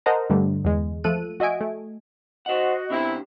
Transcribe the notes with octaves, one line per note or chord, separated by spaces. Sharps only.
A#4 C5 D#5 F#5 A5 A#5
G2 D3 G3 A3
E2 G#3
F3 A3 A4 F#6 D#7
F#4 D#5 E5 G#5 D7
A3
F#4 C5 D#5 F#5
B2 C4 D4 E4 G4